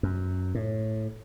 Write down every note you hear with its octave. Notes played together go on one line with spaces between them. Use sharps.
F#2
A2